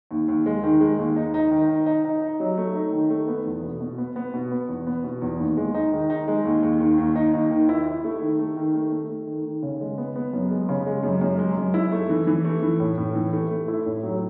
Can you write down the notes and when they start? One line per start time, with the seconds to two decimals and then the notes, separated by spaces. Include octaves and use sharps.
0.11 D#2
0.28 D#2
0.46 G#3
0.63 D#3
0.81 G#3
0.99 D#2
1.16 D#4
1.34 D#4
1.51 D#3
1.69 D#4
1.86 D#4
2.05 D#4
2.22 D#4
2.40 F#3
2.57 A3
2.75 D#4
2.93 D#3
3.10 A3
3.28 B3
3.46 E2
3.63 B2
3.81 B2
3.98 B3
4.16 B3
4.34 B2
4.52 B3
4.69 E2
4.87 B3
5.04 B2
5.22 E2
5.39 D#2
5.57 G#3
5.74 D#4
5.92 D#3
6.10 D#4
6.28 G#3
6.45 D#2
6.63 D#2
6.80 D#3
6.98 D#2
7.16 D#4
7.33 D#2
7.51 D#3
7.69 E4
7.87 E4
8.04 A3
8.22 D#3
8.39 A3
8.57 D#3
8.75 A3
8.92 A3
9.09 A3
9.27 D#3
9.45 D#3
9.63 C#3
9.81 G#3
9.98 B3
10.16 B3
10.33 F#2
10.51 G#3
10.69 C#3
10.86 G#3
11.03 F#2
11.21 F#2
11.38 G#3
11.56 F#2
11.74 E4
11.92 A3
12.09 E3
12.27 E3
12.44 A3
12.62 E3
12.80 A2
12.98 A2
13.15 E3
13.33 A3
13.51 A3
13.68 E4
13.86 A2
14.03 F#3